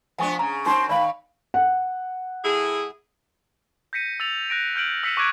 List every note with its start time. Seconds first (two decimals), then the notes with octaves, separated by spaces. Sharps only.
0.18 F3 B3 D4 F#5 G#5 C#6
0.39 C#3 A#5
0.66 F#2 C4 D#4 C6
0.89 D#3 D5 F5 B5
1.54 F#5
2.44 A2 E4 G#4
3.93 G6 A#6 B6 C#7 D#7
4.20 E6 A6 F7
4.50 F#6 A#6 D7
4.76 F6 G6 D7 F#7
5.03 E6 B6 C#7 D#7 E7
5.17 C#6 D6 F#6 G#6 D7